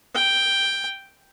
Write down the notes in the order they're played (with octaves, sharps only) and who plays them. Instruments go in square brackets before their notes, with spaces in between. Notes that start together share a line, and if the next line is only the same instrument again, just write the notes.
[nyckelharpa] G5